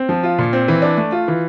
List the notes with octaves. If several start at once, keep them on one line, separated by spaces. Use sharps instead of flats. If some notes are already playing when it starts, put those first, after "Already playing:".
Already playing: C4
F3
F4
A#2
C4
E3
D4
A3
F4
E3